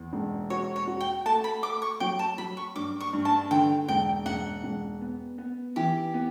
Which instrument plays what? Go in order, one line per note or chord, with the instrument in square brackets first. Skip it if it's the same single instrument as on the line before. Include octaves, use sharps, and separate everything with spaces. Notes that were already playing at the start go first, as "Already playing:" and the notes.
Already playing: [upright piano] E2
E1
[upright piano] F#4 [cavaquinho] C#5
[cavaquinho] C#5
[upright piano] F#4
[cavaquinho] G5
[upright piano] A3 [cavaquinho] A5
[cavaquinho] B5
[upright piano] A3 [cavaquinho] D6
[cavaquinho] C#6
[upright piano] F#3 [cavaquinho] G5
[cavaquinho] A5
[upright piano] F#3 [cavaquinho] B5
[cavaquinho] C#6
[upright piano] G2 [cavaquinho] D6
[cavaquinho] C#6
[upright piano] G2
[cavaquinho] A5
[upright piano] D3 [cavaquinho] G5
[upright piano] E1 [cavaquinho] G5
[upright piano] E1 [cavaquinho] F#5
[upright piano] E1
B3
B3
[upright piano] E3 [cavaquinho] G4
[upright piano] B3